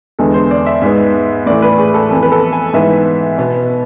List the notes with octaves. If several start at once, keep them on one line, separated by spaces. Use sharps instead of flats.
E2 D3 G#3 B3 A4
C5
D5
E5
G#2 G#3 B3
A2 E3 A3 D5
B4
G#4
A4
F2 E3 B3 A4
B4
A4
G#5
G#2 E3 B3 E5
B2 B3